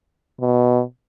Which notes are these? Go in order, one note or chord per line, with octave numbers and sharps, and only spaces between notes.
B2